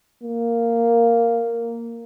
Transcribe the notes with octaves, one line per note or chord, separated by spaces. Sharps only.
A#3